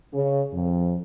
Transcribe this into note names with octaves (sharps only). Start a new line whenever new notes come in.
C#3
F2